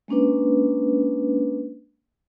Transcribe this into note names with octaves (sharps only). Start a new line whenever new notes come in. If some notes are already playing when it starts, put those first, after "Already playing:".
G#3 A#3 C#4 D4 B4